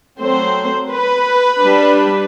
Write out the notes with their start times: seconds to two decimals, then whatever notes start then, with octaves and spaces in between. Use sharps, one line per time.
0.20 F#3 A3 C4 C5
0.90 B4
1.62 G3 D4